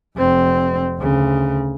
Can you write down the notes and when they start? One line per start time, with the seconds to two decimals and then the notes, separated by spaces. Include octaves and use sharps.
0.17 F1 C4
0.98 D2 C#3